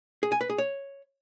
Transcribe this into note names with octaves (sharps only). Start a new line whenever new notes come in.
G#4
G#5
B4
G#4
C#5